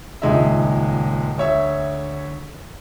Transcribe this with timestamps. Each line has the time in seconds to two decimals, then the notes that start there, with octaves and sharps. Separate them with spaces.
0.22 D#1 C#2 G#3 D#4 E5
1.38 D2 C#5 E5